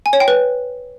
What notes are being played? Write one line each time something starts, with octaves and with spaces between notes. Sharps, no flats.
G#5
C#5
G5
B4